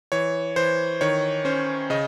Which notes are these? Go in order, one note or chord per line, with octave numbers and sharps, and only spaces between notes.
E3 C#5
E3 C5
D#3 C#5
C#4 C5
C#3 D#5